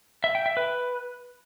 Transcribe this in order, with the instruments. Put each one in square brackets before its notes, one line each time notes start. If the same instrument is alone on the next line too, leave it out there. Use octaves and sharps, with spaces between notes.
[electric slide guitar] E5
G5
E5
B4